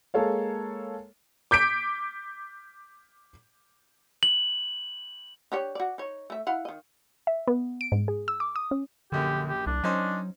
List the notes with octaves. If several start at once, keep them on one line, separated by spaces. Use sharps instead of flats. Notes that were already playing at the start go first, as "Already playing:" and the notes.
G#3 A#3 A4 C#5 F5
D6 G6 B6 D7
F#7
D4 G4 C#5
F#4 D5
D#4 C#5
A3 E5
E4 F5 F#5
D#3 D#5
E5
B3
D7
G#2
G#4
E6
D6
D#6
C#4
A#1 F#2 D3 G4
G4
C2 D4
F#3 C#4 D#4 C5